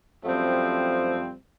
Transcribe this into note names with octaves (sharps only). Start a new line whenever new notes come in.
F#2 F3 G3 A3 C4